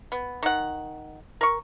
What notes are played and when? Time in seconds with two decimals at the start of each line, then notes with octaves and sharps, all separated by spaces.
0.12 B3
0.43 D#3 F#5
1.41 A#4 C#6